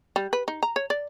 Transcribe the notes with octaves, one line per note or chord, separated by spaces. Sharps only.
G3
B4
D#4
A#5
C#5
D5